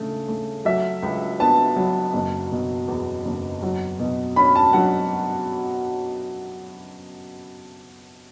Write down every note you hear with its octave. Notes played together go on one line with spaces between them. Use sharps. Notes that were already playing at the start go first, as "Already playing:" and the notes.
Already playing: C#3 A3
A3
F#3 E5
C#2
B3 A5
F#3
F#1
B2
E2
F#1
F#3
B2
C#4 B5
A5
F#3 F#5